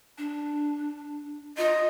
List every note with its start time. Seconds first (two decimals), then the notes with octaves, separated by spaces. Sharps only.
0.18 D4
1.57 F4 D#5